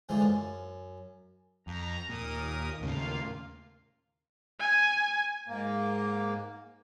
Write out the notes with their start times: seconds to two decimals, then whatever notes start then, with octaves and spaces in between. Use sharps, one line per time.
0.09 G#2 D3 E3 F3 G#3
0.22 F#2
1.67 F2 A#5
2.09 D#2 A#2 A#4 D#6
2.82 D#2 A2 C#3 A#3 F4 F5
4.59 G#5
5.48 G#2 A#3